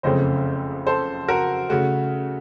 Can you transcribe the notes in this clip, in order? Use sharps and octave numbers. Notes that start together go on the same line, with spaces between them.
F#1 F2 C#3 A3 C4 C5 D#5
A4 C5
F#4 A#4
C#3 A3 F#4